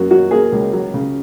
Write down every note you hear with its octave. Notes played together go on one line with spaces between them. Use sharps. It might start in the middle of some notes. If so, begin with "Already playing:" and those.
Already playing: F#2 A#3 F#4
F#3 F#4
A#3 G#4
C#2
F#3
C#3